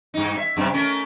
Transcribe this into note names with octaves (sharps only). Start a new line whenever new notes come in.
G2 D#4
E5
F#2 C3 D4
A3 C#4 A#4